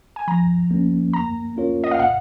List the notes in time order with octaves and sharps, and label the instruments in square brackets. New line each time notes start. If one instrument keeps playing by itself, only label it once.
[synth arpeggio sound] G#5
[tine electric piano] F3 [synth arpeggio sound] A#5
[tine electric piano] A#3 C#4
[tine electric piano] A#3 [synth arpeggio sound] A#5
[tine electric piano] C#4 F4 A#4 C#5
[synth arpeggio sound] D#5
F5
[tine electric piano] A#2 [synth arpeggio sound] F#5